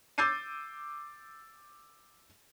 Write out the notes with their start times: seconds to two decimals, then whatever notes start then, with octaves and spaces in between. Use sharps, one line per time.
0.18 D6 E6 G6 A6 C7 D#7